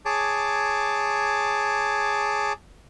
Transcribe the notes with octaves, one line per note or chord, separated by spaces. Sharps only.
G#4 C#5 A5 D6